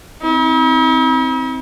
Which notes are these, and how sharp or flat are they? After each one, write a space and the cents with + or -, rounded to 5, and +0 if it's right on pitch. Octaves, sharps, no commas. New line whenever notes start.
C4 +0 E4 -45